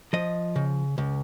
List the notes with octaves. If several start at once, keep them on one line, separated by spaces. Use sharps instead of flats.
F3 D#5
C#3
C#2